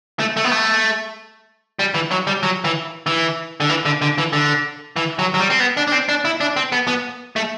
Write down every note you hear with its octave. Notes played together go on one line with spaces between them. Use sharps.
A3
A3
B3
A3
G3
E3
F#3
G3
F#3
E3
E3
D3
E3
D3
D3
E3
D3
E3
F#3
F#3
G3
C4
B3
D4
D4
C4
D4
E4
D4
C4
B3
B3
A3